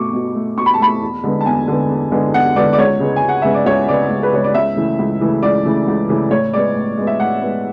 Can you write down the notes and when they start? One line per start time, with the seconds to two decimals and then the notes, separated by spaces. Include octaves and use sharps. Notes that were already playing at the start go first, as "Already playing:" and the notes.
Already playing: B2 A3 C#6 D6
0.13 B2
0.35 A3
0.58 B2 C#6
0.66 B5
0.74 A5
0.80 A3 B5
1.01 E2
1.24 D3 G#3 B3
1.41 A5
1.46 E2 G#5
1.68 D3 G#3 B3
1.90 E2
2.12 D3 G#3 B3
2.34 E2 F#5
2.56 D3 G#3 B3 D5
2.73 D5
2.78 C#2 C#5
3.00 C#3 G#3 B3
3.16 G#5
3.22 C#2
3.29 F#5
3.42 C#3 G#3 B3 E5
3.54 D5
3.66 C#2 C#5
3.89 C#3 G#3 B3 D5
4.11 C#2
4.23 B4
4.33 C#3 G#3 B3 C#5
4.44 D5
4.54 C#2 E5
4.76 C#3 E3 A3
4.99 C#2
5.21 C#3 E3 A3
5.43 C#2 D5
5.65 C#3 E3 A3
5.87 C#2
6.09 C#3 E3 A3
6.31 A2 C#5
6.53 G#3 B3 D5
6.75 A2
6.97 G#3 B3
7.07 E5
7.20 A2 F#5
7.42 G#3 B3